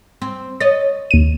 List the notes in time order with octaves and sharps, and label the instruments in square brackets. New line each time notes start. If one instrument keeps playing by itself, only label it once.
[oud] C4
[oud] C#5 D#5 [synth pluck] A6
[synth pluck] D#2 D#7